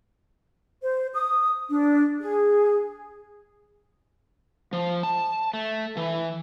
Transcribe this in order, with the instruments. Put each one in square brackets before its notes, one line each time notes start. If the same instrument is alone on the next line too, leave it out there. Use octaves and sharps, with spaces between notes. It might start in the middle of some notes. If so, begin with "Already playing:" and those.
[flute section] C5
D#6
D4
G#4
[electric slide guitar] F3
A5
A3
E3